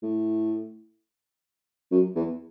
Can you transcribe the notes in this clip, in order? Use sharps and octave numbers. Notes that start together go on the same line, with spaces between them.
A2
F#2
E2